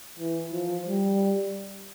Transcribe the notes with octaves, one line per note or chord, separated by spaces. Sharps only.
E3
F3
G3